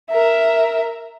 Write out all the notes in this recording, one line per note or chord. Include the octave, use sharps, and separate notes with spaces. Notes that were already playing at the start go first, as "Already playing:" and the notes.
A#4 E5